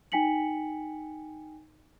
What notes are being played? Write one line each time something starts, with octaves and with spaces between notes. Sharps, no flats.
D#4 G5 G#5 B6 C#7 F#7